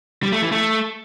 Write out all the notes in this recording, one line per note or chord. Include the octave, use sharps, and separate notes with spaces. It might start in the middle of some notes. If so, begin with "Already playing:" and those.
G3
A3
E3
A3